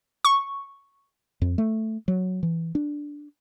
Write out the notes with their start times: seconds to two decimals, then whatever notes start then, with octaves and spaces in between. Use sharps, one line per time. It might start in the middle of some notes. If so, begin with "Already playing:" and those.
0.25 C#6
1.42 F2
1.58 A3
2.08 F#3
2.43 E3
2.75 D4